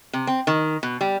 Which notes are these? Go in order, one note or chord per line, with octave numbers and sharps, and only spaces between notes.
C3
C4
D#3
B2
G3